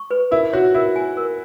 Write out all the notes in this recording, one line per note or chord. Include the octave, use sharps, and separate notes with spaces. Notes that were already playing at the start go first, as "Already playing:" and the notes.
Already playing: C#6
B4
E4 A#4
F#4 C#5
E4 A#4
G#5
A#4